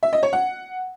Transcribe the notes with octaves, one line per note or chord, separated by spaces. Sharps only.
E5
D#5
C#5
F#5